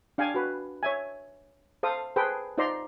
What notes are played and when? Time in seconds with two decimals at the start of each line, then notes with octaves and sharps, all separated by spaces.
0.18 D4 F5 G5 G#5
0.34 F#4 B4
0.83 C#5 E5 G#5
1.83 A4 C5 F5 D#6
2.16 G#4 A4 B4 C5 G5
2.58 D#4 F4 C5 D5 A#5 C6